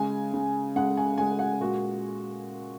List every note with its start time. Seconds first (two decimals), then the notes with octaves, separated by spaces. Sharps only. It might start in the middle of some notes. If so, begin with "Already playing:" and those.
Already playing: C#3 G#3 G#5
0.34 C#3 G#3
0.76 C#3 G#3 F#5
0.97 G#5
1.18 C#3 G#3 G#5
1.39 F#5
1.61 A#2 G#3 F#4